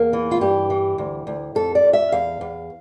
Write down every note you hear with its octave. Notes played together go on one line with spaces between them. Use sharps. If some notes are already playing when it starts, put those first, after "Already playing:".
Already playing: E2 A#3
E3
F4
G2 G4
E3
D2
D2
F2 A4
D5
F2
E5
E2 F5
E2